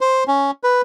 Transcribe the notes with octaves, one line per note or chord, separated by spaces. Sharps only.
C5
C#4
B4